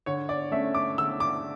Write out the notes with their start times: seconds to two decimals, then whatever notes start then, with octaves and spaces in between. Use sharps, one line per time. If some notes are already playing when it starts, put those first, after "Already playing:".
0.06 D3 C#5
0.29 D5
0.52 A3 C#4 E5
0.75 D6
0.98 D3 E6
1.20 D6